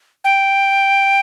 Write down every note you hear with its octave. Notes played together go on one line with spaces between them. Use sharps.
G5